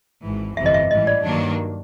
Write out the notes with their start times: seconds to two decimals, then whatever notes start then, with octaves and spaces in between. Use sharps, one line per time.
0.23 G#1 G#2 E3
0.57 G1 F2 C3 E3 E5
0.66 D#5
0.74 E5
0.91 A1 G#2 E3 G3 D#5
1.07 D5
1.25 G2 D#3 F#3 A#3 D4